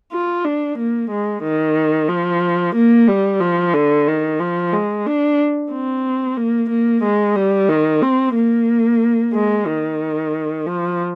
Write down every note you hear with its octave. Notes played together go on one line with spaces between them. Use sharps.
F4
D4
A#3
G#3
D#3
F3
A#3
G3
F3
D3
D#3
F3
G#3
D4
C4
A#3
A#3
G#3
G3
D#3
C4
A#3
G#3
D#3
F3